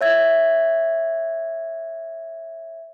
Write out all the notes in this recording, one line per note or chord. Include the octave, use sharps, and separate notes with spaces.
C#5 E5 G#6